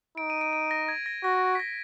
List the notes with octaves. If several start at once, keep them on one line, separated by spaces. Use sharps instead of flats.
D#4 D7
D#7
D7
D7
A#6
G#6
A#6
F#4 A#6
B6
A#6